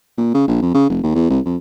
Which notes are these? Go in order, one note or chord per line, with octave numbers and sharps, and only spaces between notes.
A#2
C#3
A#1
F2
C#3
F1
D#2
E2
C2
F2